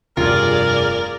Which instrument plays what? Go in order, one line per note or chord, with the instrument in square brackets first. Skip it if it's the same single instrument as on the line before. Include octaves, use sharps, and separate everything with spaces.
[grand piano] F1 G2 [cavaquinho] F4 [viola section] G#4 D5 [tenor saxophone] A#4